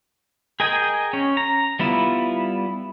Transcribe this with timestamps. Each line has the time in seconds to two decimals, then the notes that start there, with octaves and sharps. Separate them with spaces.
0.60 G#4 A#4 D#5 G5 G#5
1.13 C#4
1.37 A#5
1.79 G3 B3 E4 F4